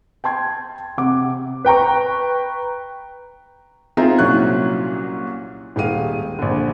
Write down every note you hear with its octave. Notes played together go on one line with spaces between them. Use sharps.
G5 A5 C6 G#6
C3 C4 F#5 D6
B4 G5 A#5 C#6
C4 D#4 F4 G#4 E5 A#5
C2 A#2 F#3 C#4 C#6 F#6
D#1 G#3 G4 F5 D#7
A#1 D3